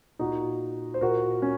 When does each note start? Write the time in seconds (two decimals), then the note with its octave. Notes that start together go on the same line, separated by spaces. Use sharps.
0.19 A#2 D#4 F#4
0.94 C5
1.01 A#2 F#4 A#4
1.42 C#4